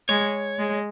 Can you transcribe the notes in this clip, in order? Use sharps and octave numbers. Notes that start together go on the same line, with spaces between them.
G#3 C#5
G#3